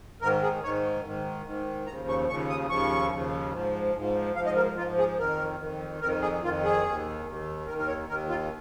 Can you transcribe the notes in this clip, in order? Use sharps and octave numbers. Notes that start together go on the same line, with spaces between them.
G#2 D#3 A#4
G#4
G#2 D#3 C#5
G#2 D#3
G#2 D#3
D#2 C#3 F3 A#5
C#6
D#2 C#3 F3 C#6
D#6
D#2 C#3 F3 C#6
D#2 C#3 F3
G#2 F3
G#2 F3
G#2 F3 F5
D#5
A#4
G#2 F3 F4
G#4
F2 D#3 A#4
F2 D#3
F2 D#3 A#4
G#4
F2 D#3 F4
G#4
D#2 D#3
D#2 D#3
D#2 D#3 A#4
A#4
C#5
D#2 D#3 A#4
F4